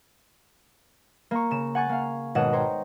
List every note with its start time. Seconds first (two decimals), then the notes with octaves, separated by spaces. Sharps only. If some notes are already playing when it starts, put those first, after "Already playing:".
1.31 A#3 A#5 C#6
1.51 C#3 E7
1.75 F#5 G#5 C#6 A6
1.89 A#3 F5
2.35 G#1 B2 C#5 D#5 F#5 E7
2.53 C5 C#5 G5 A#5